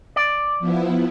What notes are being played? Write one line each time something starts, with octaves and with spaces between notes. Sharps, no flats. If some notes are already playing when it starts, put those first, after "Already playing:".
D5
F3 B3 E4